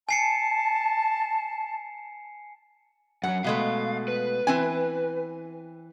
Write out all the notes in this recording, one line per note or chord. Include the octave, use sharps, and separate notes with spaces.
G#5 A5 C7 C#7
F#2 F#3 F#5
B2 G#3 A3 F5
B4
E3 C4 G#5